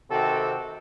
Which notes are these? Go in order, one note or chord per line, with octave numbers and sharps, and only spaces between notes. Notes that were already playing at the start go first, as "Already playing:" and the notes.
C3 D#3 C4 F#4 A4